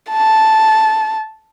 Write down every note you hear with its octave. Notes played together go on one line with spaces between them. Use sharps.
A5